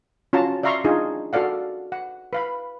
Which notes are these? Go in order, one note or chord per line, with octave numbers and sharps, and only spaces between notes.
C#4 F4 F#4 A5 A#5
D5 E5 F5 A#5 C6 C#6
D4 D#4 F4 G#4
F#4 A4 D5 F5 F#5
F#5
B4 F5 B5